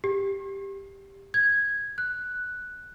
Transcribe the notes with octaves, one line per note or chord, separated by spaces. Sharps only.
G4
G#6
F#6